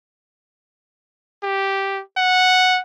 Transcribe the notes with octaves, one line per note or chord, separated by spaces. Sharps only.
G4
F#5